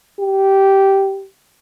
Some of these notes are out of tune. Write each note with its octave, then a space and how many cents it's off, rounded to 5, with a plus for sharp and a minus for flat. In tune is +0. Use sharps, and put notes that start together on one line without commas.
G4 -10